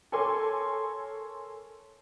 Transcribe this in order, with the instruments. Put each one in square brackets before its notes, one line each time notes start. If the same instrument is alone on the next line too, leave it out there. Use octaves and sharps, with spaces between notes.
[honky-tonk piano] A4 A#4 C#5 G#5 C6 D6